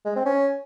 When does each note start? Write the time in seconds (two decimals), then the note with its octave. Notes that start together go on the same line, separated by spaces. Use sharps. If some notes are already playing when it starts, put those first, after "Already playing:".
0.05 G#3
0.15 C4
0.26 C#4